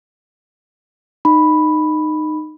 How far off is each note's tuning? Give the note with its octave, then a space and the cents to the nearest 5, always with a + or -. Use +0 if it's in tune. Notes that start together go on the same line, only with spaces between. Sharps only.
D#4 -20 B5 +0